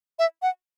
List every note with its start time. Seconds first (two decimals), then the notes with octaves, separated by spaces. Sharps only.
0.19 E5
0.42 F#5